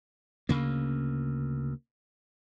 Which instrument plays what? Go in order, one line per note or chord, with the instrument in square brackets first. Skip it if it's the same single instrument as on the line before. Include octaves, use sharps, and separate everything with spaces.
[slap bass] D2 C#3 A#3